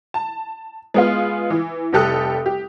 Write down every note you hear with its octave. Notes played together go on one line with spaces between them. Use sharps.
A5
G#3 B3 F4
E3
F1 G3 G4 A4 D#6 F#6
G4